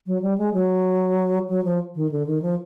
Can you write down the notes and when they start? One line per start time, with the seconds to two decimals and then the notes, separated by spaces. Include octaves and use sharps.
0.07 F#3
0.22 G3
0.38 G#3
0.54 F#3
1.49 F#3
1.64 F3
1.95 D#3
2.12 D3
2.27 D#3
2.42 F3